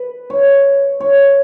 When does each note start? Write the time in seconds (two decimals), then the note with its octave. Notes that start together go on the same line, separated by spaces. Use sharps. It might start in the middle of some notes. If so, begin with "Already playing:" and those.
Already playing: B4
0.30 C#5
1.00 C#5